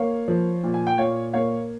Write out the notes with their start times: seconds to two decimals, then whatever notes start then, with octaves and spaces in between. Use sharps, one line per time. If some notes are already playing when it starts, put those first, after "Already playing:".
Already playing: A#3 C#5 F5
0.28 F3
0.63 A#2
0.74 G#5
0.87 G5
0.98 A#2 C#5 F5
1.33 A#3 C#5 F5